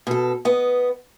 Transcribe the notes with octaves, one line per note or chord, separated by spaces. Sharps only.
B2 A4
B3 D#5